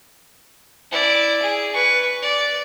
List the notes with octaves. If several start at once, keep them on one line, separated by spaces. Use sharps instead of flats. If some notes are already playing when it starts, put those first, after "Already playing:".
E4 D5
G#4
B4 C#6
D5